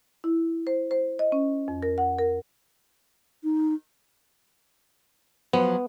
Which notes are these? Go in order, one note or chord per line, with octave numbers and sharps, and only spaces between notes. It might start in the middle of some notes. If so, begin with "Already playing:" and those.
E4
C5
C5
D#5
C#4
F2
A#4
F#5
A#4
D#4
F3 F#3 B3 C5